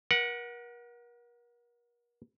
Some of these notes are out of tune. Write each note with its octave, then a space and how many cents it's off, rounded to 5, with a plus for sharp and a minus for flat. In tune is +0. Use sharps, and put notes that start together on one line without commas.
A#4 +40 F#5 -5